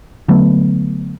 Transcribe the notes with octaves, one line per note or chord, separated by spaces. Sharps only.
D3 F#3 A3 B3